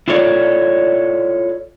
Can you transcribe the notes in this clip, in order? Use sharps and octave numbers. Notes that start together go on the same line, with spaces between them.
E4 F4 A4 C#5 D5